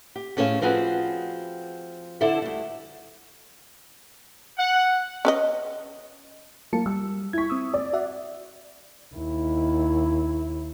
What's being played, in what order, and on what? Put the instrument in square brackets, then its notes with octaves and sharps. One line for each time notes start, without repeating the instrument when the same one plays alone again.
[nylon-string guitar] G4
A2 C#4 G#4 C5 F5
F3 C4 F#4 G#4 B4
D3 E4 A4 C5 E5
D2 G3
[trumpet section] F#5
[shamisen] C#4 B4 D#5
[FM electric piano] F#3 A5 C#7 [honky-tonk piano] A#3
[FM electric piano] G3 [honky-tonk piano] E6
[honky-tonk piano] E4 C#6 [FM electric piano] G#6 B6
[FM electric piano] C4 D#6 E6
[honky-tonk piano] D5
[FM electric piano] F#4 E5 F#5
[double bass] D#2 E4